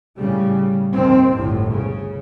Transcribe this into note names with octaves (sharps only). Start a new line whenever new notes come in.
A2 C#3 G3
D#2 D#3 C4
G1 D2 A2
C#3